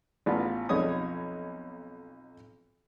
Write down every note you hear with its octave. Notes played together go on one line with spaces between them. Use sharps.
A1 B3 F4
B1 F2 D#4 C#5 D#6